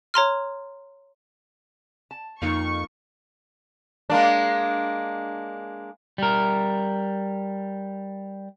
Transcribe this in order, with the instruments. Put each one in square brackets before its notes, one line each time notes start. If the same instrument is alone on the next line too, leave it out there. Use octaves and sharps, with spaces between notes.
[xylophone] C#5 A#5 C6 F6
[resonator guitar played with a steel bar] A5
[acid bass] F2 [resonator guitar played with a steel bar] F3 A#3 F4 [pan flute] D#4 [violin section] C#6
[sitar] G#3 A#3 D4
[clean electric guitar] G3 A#4